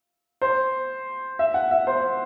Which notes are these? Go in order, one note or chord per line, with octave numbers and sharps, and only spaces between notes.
C5
E5
F#5
E5
C5